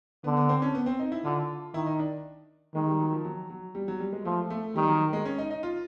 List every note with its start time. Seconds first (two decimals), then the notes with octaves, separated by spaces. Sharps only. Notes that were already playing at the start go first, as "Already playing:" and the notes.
0.24 D3 B3
0.37 B3
0.49 C4
0.62 C#4
0.75 B3
0.86 C4
0.99 D#4
1.12 E4
1.24 D3 F4
1.74 D#3 E4
1.86 D#4
2.00 D4
2.74 D#3 G#3
2.87 G3
3.00 F#3
3.13 F3
3.25 F#3
3.50 F#3
3.75 G3
3.88 F#3
4.00 G3
4.13 G#3
4.25 F3 A3
4.50 A3
4.76 D#3 G3
4.87 F#3
5.13 G#3
5.25 C#4
5.38 D#4
5.51 D#4
5.63 F4